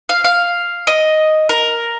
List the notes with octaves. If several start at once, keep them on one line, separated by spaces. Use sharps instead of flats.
F5
F5
D#5
A#4